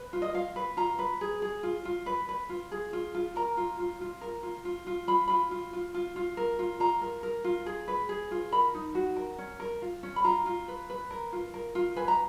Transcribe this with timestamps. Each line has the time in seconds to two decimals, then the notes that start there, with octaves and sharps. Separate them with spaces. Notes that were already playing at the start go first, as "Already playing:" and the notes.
Already playing: B4
0.13 F4
0.22 D#5
0.34 F4 F5
0.56 B4
0.77 F4 A#5
0.99 B4
1.21 G#4
1.42 G#4
1.63 F4
1.85 F4
2.06 B4
2.29 B4
2.49 F4
2.72 G#4
2.93 F4
3.15 F4
3.36 A#4 A#5
3.57 F4
3.79 F4
4.01 F4
4.21 A#4
4.43 F4
4.65 F4
4.87 F4
5.08 F4 B5
5.28 F4 B5
5.51 F4
5.73 F4
5.94 F4
6.16 F4
6.37 A#4
6.59 F4
6.80 F4 A#5
7.01 A#4
7.23 A#4
7.44 F4
7.66 G#4
7.88 B4
8.09 G#4
8.31 F4
8.52 A#4 B5
8.74 D#4
8.95 F#4
9.16 A#4
9.38 C#4
9.60 A#4
9.82 F4
10.03 C#4
10.16 B5
10.24 F4 A#5
10.46 F4
10.68 B4
10.90 B4
11.11 A#4
11.33 F4
11.54 A#4
11.75 F4
11.96 B4 G#5
12.08 A#5